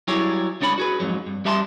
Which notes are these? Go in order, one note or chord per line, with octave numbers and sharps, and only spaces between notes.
F#3 G3 E4 G4 G#4 C#5
C#2 G3 D4 C#5 A#5 B5
F#4 G#4 B4
F2 G#2 F#3
G2
G3 G4 E5 A5 B5 C6